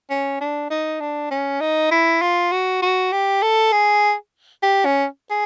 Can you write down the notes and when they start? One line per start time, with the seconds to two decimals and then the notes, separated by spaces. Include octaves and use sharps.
0.10 C#4
0.41 D4
0.70 D#4
1.01 D4
1.31 C#4
1.61 D#4
1.91 E4
2.22 F4
2.52 F#4
2.82 F#4
3.12 G4
3.42 A4
3.72 G#4
4.63 G4
4.85 C#4
5.31 G#4